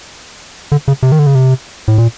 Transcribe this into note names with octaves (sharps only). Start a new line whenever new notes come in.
D3
C#3
C3
D#3
D3
C#3
C3
A2
A#2